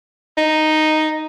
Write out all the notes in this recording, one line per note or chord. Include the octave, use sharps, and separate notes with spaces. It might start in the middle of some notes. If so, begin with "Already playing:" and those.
D#4